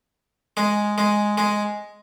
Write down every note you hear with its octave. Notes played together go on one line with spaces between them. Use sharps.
G#3
G#3
G#3